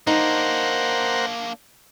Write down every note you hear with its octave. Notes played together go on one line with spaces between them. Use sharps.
A#3 D4 D#4 A#4 C5 F#5